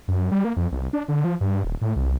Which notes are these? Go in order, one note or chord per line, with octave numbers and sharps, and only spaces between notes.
F#2
G3
A#3
F2
C2
D4
D3
F3
G2
D#1
A2
C2